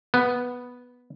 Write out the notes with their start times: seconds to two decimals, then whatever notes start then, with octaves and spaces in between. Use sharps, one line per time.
0.14 B3